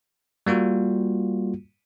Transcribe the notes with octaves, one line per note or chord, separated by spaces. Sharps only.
G3 A#3 F4 F#4